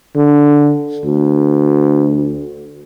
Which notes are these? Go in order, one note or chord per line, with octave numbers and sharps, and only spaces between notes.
D3
D2